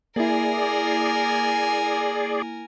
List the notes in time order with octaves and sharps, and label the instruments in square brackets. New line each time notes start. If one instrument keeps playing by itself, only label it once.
[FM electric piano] A#3 E4 [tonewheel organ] G#4 D5 [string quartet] A#4 G#5